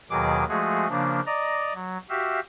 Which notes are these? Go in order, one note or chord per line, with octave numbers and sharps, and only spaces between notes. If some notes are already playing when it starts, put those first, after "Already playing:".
D#2 B2 D#3 F#3 G#4 D6
F3 G#3 A3 F#4 G#4
C#3 F3 A#3 D4
D5 D#5 A#5
F#3
F#4 G4 E5 F5